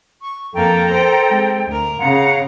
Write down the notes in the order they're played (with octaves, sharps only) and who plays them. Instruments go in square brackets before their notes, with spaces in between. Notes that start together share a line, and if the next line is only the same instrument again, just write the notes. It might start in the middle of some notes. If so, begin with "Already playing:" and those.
[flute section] C#6
[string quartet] F2 A#3 [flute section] A4 G5 A#5
[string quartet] A#4 C5
G#3 C4
D2 A#4
[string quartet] C#3 [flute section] F5 F#5 A#5